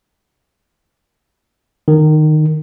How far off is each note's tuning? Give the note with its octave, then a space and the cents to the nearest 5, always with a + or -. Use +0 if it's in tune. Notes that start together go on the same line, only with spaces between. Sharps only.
D#3 -15